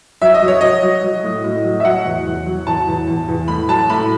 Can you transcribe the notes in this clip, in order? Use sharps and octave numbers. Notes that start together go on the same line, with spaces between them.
F#3 E5
D#5
F#3
C#5
F#3 D#5
F#3
F#3
A2
A2
F#3
E5
F#3 F#5
E2
E2
F#3
E2 A5
E2
E2
E2
A2 B5
F#3 A5
A2 B5